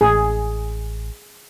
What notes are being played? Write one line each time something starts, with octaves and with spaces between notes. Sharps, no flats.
A1 G#4